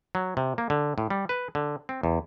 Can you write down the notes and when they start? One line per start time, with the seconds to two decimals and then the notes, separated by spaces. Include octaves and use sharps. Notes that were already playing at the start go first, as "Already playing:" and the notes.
0.15 F#3
0.37 C3
0.58 A#3
0.70 D3
0.98 A2
1.10 G3
1.29 B4
1.55 D3
1.89 C4
2.03 E2